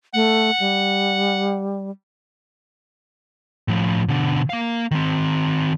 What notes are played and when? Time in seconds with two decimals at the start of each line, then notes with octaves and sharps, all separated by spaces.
0.14 A3 F#5
0.60 G3
3.68 A2 F3
4.08 B2 D3
4.50 A#3 F5
4.91 D#3 C4